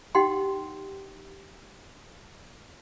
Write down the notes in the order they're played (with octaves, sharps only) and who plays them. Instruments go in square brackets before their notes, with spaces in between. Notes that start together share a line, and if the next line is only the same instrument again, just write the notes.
[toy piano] D#4 G4 F#5 G5 C6